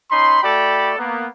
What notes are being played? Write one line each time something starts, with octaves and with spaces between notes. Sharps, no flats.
C#4 D#4 B5 C6
A3 F#4 A4 D5 G5 B5
A#3 B3